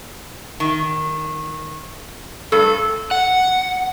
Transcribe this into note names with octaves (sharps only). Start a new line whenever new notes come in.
D#3
G2 A4
F#5